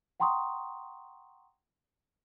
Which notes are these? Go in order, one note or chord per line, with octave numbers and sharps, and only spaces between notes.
F#5 G5 A#5 C6 C#6 D#6